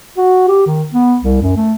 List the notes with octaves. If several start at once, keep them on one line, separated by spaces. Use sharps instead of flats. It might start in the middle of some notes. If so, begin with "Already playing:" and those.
F#4
G4
D#3
B3
C2
F#2
A3